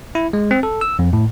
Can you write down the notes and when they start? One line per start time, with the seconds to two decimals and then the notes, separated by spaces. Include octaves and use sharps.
0.15 E4
0.33 G#3
0.51 C4
0.63 A4
0.81 E6
0.99 F2
1.13 A2